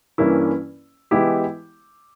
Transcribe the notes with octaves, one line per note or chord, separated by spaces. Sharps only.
G2 E3 A#3 C#4 E4
E3 G#3 B3 E4 G4